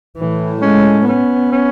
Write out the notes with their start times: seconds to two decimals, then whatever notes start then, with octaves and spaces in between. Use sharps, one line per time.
0.18 A2 E3
0.61 G#3 C#4
1.06 B3 C#4
1.51 C#4